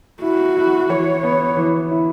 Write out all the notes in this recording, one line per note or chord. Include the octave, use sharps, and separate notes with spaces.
E4 F#4
E4
E3 C#5
B3
E3
E4